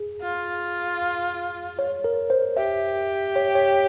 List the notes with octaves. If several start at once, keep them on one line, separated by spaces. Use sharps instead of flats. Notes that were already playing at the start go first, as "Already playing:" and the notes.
Already playing: G#4
F4
C#5
A#4
C5
G4 E5
C#5
C#5